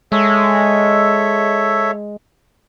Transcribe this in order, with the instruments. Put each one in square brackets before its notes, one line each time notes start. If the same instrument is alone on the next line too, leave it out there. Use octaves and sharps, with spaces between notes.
[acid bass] G#3 [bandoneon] A4 C#5 E5